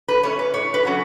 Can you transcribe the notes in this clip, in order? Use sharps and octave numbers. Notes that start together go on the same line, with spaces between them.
B4
A3 C#4 C#5
B4
A2 C#5
B4
F#3 A3 C#4